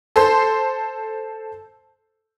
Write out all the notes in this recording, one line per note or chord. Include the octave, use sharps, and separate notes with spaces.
A4 C5 C6